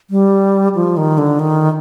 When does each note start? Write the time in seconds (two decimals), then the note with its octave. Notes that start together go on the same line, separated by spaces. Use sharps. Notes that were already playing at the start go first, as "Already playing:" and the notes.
0.10 G3
0.75 F3
0.97 D#3
1.18 D3
1.39 D#3